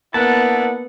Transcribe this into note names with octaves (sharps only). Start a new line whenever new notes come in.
A#3 B3 D4 E4 F#5 A5